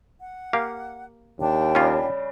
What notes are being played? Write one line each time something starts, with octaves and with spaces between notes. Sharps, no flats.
F#5
A#3 G4 F5
D#2 D4 G5
C#3 G3 C#4 F4